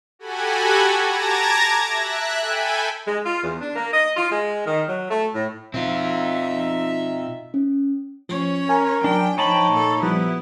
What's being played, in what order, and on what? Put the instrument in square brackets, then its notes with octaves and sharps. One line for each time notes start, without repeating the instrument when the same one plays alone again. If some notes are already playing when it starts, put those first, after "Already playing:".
[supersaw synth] F#4 G4 A4 F#5 G#5 B5
A5 A#5 D6 G#6 A#6
E5 F#6
A4 G5 G#5 B5
[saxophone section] G#3
F4
E2
D4
A#3
D#5
F4
G#3
D#3
F#3
A3
A2
[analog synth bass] B2 [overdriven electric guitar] C4 F4 [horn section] D#4 E5
[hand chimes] C#4
[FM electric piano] F3 [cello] C#4 C#5
[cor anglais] A#4 [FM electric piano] G#5
[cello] F#3 G5 [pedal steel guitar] D4
[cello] F3 G5 [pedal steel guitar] D#4 A5 B5 [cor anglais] C#5
[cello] A#2 A4
[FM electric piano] F3 G3 [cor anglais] B3 [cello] E4